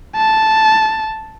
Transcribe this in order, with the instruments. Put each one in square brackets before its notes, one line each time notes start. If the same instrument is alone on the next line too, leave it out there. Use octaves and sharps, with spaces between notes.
[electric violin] A5